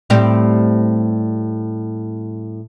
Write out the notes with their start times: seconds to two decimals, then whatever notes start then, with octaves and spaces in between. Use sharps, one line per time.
0.10 A2 G3 C4